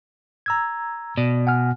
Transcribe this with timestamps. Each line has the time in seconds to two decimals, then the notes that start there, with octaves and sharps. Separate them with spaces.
0.46 A#5 E6 G#6
1.17 B2 D5
1.47 F#5 G#5 F6